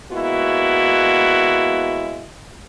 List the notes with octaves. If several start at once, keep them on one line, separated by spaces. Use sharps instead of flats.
G#3 A#3 B3 E4 F#4